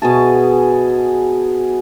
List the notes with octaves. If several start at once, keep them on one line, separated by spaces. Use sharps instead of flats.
B2 G#4 A5